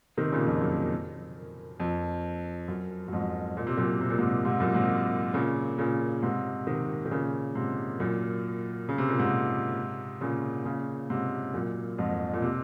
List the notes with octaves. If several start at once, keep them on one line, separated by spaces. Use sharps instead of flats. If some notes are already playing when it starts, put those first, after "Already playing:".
C3 D#3
A#2 C#3
F2
F#2
F2
F#2
F#2
F2 G#2
A#2
C3
F#2 A#2
C3
A#2
G#2 C3
G#2 C3
F#2 A#2
G#2 C3
A#2 C#3
A#2 C#3
G#2 C3
C3 D#3
D#3
A#2 C#3
G#2 C3
F#2 A#2
C#3
C3
A#2
G#2 C3
A#2 C#3
A#2 C#3
G#2 C3
F#2 A#2
F2 G#2
A#2
C3